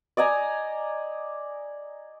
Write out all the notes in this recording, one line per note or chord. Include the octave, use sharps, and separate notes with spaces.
D5 D#5 G#5 A#5